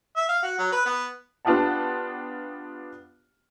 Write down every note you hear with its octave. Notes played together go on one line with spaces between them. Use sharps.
E5
F5
F#4
F#3
B4
B3
B3 D4 F4 G4 F#5 A5